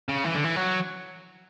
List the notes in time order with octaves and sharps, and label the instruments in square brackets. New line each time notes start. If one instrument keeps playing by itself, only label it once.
[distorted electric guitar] C#3
E3
D3
E3
F#3